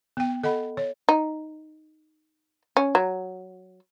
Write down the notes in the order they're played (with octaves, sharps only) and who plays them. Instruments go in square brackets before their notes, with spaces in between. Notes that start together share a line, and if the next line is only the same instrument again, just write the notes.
[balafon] B3 G5
A4 D#5 F#5 B5
C#5
[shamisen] D#4
C#4
F#3